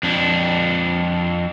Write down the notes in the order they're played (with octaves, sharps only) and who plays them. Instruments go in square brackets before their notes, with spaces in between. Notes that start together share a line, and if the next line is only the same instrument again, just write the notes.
[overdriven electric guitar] F2 D4